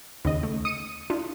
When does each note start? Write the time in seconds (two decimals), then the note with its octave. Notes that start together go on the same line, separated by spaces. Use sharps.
0.25 D#2 C#3 D#5
0.43 A3
0.65 D#6 C#7 D#7
1.10 D4 E4 F4